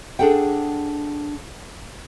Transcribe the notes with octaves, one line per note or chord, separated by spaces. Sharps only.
D4 G#4 A4 F#5 G5